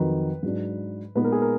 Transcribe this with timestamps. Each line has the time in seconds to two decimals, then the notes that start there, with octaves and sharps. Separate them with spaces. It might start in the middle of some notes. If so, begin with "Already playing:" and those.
Already playing: F2 D#3 F#3 B4
0.43 G#2 F#3 D4
1.15 A#2 G#3 B3 D#4 B4
1.24 A#4
1.32 G#4
1.42 A#4